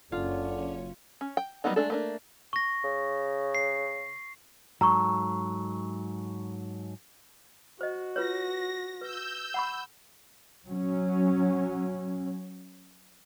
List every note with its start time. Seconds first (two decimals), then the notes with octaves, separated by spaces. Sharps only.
0.12 F#1 D3 C#4 F4 C#5
1.21 C#4
1.37 G5
1.64 F#3 G3 A#3 B3 D#4
1.76 G#3 A3 D4 A4
1.90 A3 A#3 D4
2.53 C#6 A#6
2.84 C#3
3.55 C7
4.81 G#2 F#3 A4 A#5 C#6
7.81 F#4 C5 D#5
8.16 F4 B4 C#5 A#6
9.01 B4 E6 G6
9.54 F#5 B5 C#6
10.67 F#3 C#4